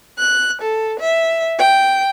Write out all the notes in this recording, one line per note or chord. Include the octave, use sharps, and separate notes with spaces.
F#6
A4
E5
G5